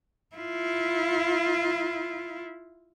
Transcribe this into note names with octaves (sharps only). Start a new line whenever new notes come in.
E4 F4